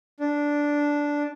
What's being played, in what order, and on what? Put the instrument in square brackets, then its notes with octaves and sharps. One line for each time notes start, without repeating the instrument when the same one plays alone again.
[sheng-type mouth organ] D4